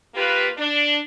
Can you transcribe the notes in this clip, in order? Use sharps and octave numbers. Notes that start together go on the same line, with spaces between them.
A#3 F4 G4 B4
D4